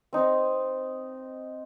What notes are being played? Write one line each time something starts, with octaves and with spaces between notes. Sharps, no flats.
C4 D#4